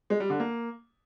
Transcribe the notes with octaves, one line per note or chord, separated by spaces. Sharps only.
G#3
G3
D3
A#3